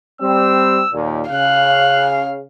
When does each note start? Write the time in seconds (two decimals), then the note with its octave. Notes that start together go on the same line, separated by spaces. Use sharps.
0.21 G3 C4 E6
0.92 D#2 A#2
1.31 C#3 F5 F#6